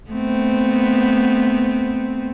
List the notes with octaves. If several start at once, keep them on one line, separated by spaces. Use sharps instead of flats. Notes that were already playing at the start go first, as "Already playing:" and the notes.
A3 B3 C4